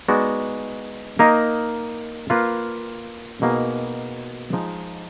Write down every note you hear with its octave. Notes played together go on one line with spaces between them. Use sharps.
G#3 B3 D#4 F#4 D5
A#3 D#4 A#4 D#5
A#3 F4 B4
B2 A#3 D#4 G#4
F3 G#3 D#4